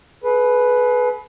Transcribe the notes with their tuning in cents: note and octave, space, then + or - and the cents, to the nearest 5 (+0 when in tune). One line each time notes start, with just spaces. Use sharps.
G#4 +40 B4 +0